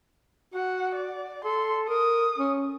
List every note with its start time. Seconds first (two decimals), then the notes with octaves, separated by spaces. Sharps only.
0.54 F#4 F#5
0.95 D5
1.45 A4 C6
1.89 A#4 D#6
2.38 C#4